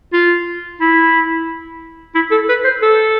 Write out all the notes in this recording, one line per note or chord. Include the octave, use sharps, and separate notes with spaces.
F4
E4
E4
A4
B4
C5
A4